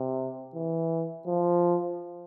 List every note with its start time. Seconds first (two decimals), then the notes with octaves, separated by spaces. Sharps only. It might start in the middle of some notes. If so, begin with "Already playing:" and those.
Already playing: C3
0.55 E3
1.27 F3